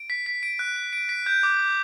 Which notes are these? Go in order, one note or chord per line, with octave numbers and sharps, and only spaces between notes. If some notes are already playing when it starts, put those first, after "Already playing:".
Already playing: D7
B6
B6
D7
F#6
D7
D7
B6
G6
D6
D6